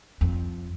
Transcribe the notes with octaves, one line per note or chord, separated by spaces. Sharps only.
F2